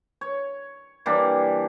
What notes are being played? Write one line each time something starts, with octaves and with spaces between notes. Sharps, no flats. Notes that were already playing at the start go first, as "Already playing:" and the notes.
C#5
E3 G3 A#3 D4